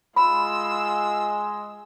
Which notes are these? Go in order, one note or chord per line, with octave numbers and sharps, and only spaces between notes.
G#3 F4 B5 E6